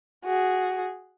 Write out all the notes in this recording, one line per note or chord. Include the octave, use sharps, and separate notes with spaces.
F#4 G#4